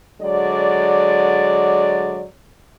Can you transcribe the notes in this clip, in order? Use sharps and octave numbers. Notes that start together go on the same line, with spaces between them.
D3 F#3 G#3 D5